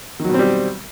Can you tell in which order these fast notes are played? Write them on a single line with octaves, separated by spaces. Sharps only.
D#3 F#3 B2 C4 G3